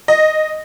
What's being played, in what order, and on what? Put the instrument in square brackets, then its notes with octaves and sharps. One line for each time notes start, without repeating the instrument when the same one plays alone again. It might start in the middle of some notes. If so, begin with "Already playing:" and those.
[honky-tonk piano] D#5